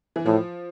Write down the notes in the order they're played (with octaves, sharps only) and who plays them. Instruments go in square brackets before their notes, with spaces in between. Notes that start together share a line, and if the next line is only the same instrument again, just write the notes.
[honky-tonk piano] E3
[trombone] A2 [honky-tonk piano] F3